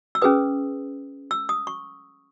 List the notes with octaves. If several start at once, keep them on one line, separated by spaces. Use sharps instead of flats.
E6
C#4 G#4 B4 D#6
E6
D#6
C#6